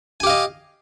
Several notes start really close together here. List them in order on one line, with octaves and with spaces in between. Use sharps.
G#5 G4 F5 D#5